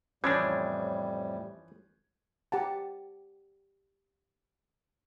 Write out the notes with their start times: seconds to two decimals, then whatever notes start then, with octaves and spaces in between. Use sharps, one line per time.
0.24 F2 A2 E3 F3 G3 C#4 D4 G#6
2.52 G4 F#5 A5